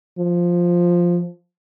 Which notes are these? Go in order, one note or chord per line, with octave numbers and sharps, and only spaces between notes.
F3